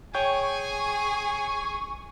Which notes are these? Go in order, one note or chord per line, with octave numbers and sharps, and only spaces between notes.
G#4 C#5 G5 G#5 C#6 G6